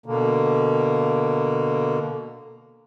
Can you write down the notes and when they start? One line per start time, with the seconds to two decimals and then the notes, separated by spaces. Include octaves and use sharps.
0.06 B2 D3 A#3